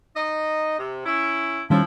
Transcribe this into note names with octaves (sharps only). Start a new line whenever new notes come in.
D#4 D#5
C3
C#4 E4
D#3 F3 G3 C#4 E4